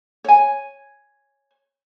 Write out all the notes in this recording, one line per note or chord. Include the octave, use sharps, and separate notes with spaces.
C#5 G#5